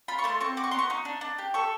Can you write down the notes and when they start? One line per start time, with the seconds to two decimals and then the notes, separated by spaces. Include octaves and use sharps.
0.08 F4 B5
0.18 C#6
0.24 A3 C6
0.41 C4 C#6
0.57 F#4 D6
0.64 C#6
0.71 B3 C6
0.79 C#6
0.90 D#4
1.05 D4
1.21 D4
1.38 G4
1.54 A4 C#6